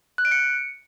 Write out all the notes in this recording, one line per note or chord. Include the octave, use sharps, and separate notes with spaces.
F#6
D7
C#7